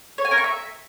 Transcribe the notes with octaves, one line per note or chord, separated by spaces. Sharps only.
C#5
G#5
A#4
C#6
E5